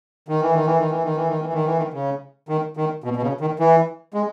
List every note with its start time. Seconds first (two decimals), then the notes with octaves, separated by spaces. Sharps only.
0.28 D#3
0.42 E3
0.54 D#3
0.66 E3
0.78 D#3
0.90 E3
1.04 D#3
1.16 E3
1.28 D#3
1.41 E3
1.53 D#3
1.65 E3
1.78 D#3
1.93 C#3
2.49 D#3
2.77 D#3
3.04 B2
3.16 B2
3.23 C#3
3.41 D#3
3.59 E3
4.14 G#3